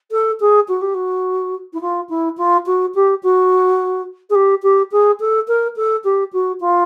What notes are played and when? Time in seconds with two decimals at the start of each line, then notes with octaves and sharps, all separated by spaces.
0.11 A4
0.40 G#4
0.68 F#4
0.81 G4
0.94 F#4
1.73 E4
1.81 F4
2.09 E4
2.37 F4
2.66 F#4
2.94 G4
3.22 F#4
4.29 G#4
4.34 G4
4.62 G4
4.91 G#4
5.20 A4
5.47 A#4
5.76 A4
6.04 G4
6.32 F#4
6.60 F4